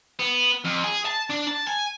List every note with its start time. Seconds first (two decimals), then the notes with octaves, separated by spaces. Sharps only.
0.19 B3
0.65 F2
0.84 G#4
1.05 A5
1.30 D4
1.47 A5
1.67 G#5